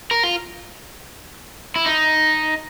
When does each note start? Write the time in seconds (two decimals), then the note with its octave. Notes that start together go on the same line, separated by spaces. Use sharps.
0.11 A#4
0.24 F4
1.76 E4
1.86 D#4